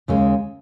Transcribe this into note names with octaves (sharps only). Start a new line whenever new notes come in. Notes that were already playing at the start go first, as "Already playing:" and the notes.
D#2 C#3 G#3